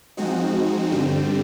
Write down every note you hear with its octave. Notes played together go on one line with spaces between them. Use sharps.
F3 G#3 C4 D#4 F#4
G2 D3 G3 C4